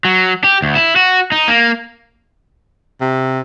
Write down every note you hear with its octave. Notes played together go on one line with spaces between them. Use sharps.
F#3
G4
D2
E4
F#4
D#4
A#3
C3